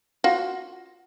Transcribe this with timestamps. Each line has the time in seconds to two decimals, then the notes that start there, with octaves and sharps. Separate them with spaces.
0.24 F4 F#4